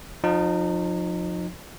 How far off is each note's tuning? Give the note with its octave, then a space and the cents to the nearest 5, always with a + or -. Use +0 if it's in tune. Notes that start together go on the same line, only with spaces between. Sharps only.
F3 +25 D#4 -25